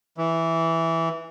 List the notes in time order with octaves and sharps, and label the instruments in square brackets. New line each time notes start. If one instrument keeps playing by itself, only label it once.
[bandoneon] E3